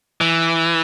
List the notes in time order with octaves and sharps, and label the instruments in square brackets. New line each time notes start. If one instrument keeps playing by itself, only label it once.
[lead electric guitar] E3